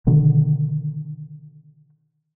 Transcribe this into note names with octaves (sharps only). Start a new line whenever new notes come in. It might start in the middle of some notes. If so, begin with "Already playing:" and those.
B2 D3 D#3